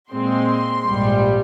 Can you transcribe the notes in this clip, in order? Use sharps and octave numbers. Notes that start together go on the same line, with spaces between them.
A#2 G#3 C4 C6
A#1 G#2 G3